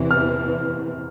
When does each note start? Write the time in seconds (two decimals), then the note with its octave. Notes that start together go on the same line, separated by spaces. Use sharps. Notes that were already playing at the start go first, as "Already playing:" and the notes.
Already playing: E2 C3 E3
0.11 F6